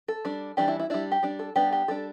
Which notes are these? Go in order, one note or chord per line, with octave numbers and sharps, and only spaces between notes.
A4
G3 D4
E3 G3 D4 G4
E4
E4
G3 D4 E4
G4
G3 D4
A4
G3 B3 D4 G4
G4
G3 D4 A4